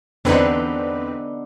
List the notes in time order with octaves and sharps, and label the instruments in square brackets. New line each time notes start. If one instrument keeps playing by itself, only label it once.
[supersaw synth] E2 C4 B4 [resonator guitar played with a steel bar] D3 D#4 [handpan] B3 D4